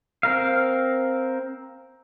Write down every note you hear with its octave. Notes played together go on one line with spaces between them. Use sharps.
C4 A#4 F5